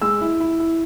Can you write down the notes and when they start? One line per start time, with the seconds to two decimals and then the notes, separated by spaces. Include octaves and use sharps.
0.01 G#3 E6
0.21 E4
0.40 E4
0.60 E4